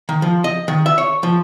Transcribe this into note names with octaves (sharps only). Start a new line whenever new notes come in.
D#3
F3
D#5
D#3
E5
C#5
F3